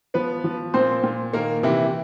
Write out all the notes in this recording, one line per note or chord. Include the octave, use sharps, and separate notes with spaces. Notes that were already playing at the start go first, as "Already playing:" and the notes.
F3 B3 B4
F3
A#2 C4 C5
A#2
D#3 A#3 A#4
C3 E3 E4